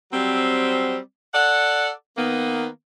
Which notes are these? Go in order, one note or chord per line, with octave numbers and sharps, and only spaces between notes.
F#3 G3 C4
A4 D5 F#5
D#3 A#3 B3